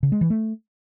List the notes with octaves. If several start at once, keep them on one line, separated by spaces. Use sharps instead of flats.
C#3
G#3
E3
A3